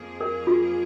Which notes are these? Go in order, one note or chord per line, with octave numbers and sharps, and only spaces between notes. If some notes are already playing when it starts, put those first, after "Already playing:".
Already playing: F2 F3 A#3 G#4
A#4
F4